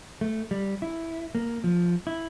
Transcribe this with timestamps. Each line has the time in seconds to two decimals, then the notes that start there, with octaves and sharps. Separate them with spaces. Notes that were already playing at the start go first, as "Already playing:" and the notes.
0.21 A3
0.51 G3
0.82 E4
1.35 A#3
1.64 F3
2.07 E4